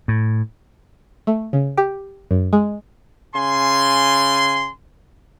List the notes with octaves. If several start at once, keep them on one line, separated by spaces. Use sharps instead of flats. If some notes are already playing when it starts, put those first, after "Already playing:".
A2
A3
C#3
G4
F#2
G#3
C#3 G#5 C6